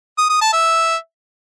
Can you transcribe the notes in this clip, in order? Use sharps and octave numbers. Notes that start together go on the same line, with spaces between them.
D#6
D#6
A5
E5